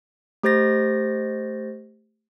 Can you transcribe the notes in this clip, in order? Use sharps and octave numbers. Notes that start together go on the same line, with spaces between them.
A3 G4 C5 G6 A6 A#6